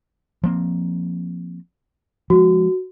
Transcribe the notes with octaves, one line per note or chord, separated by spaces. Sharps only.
F3 A#3 C4
F3 G#3 F#4